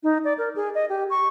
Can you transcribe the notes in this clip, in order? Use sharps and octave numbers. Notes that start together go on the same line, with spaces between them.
D#4
D5
A#4
G#4
D#5
G4
C#6